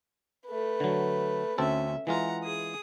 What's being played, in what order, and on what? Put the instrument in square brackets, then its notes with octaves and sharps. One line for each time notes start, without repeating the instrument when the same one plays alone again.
[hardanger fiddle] A3 B4
[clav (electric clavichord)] D3 F#3
[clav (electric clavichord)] D2 C4 A4 [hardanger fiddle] C#4 E5
[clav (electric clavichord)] E3 G#3 F4 [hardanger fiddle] F#5 A#5
[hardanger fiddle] G#4 D#6